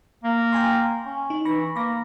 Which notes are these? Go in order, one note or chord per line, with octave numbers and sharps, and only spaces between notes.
A#3
G5 G#5 C6
C#4
D#4
E3 B5 C#6 A#6
A#3 B5 D6 A#6